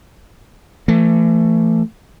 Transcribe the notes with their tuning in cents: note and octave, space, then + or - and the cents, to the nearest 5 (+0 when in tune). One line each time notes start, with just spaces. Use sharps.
E3 +40 A3 +20